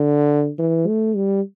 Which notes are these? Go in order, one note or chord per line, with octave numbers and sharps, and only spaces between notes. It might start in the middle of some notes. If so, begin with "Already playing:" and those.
Already playing: D3
E3
A3
G3